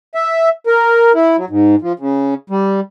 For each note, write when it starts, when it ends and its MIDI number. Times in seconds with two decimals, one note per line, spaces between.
0.15 0.49 76
0.67 1.12 70
1.15 1.36 64
1.37 1.45 54
1.50 1.75 44
1.82 1.93 53
1.99 2.34 49
2.50 2.80 55